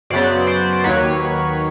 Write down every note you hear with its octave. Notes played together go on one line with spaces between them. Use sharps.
F#2 C#3 F#3 B3 C5 D5
C5 D5
D5
D#2 D#3 F#3 A#3 B4 C#5